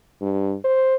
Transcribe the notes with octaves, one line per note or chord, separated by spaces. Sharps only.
G2
C5